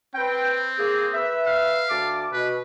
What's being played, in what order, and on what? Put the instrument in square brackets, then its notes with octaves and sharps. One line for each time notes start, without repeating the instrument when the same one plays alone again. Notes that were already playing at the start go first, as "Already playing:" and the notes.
[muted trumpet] C4 [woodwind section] B4 G5
[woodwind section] A#3 G#4
B4 E5
[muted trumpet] F5
[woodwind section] D2 A5 D6
[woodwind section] B2 [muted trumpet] B4